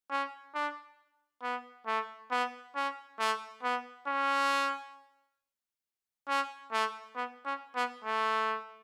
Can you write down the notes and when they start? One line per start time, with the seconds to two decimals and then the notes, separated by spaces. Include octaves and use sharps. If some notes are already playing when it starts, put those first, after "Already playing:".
0.10 C#4
0.54 D4
1.43 B3
1.87 A3
2.31 B3
2.75 C#4
3.19 A3
3.63 B3
4.07 C#4
6.28 C#4
6.72 A3
7.16 B3
7.45 C#4
7.75 B3
8.04 A3